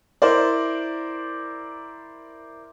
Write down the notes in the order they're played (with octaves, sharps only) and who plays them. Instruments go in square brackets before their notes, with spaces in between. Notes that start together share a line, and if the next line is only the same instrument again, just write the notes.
[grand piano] E4 A#4 C5 D5